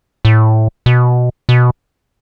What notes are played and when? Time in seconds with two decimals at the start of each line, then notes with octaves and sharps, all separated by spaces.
0.25 A2
0.86 B2
1.49 B2